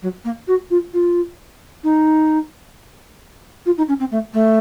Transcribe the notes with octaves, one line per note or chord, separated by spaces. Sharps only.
F#3
A#3
F#4
F4
F4
D#4
F4
D#4
C#4
C4
A3
A3